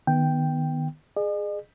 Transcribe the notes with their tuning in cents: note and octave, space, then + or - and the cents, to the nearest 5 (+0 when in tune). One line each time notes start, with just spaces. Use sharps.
D#3 -20 B3 -5 G5 +0
G#4 +0 D#5 -45